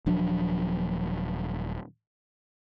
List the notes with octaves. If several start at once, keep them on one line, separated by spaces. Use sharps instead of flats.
D#1 F3 F#3 D4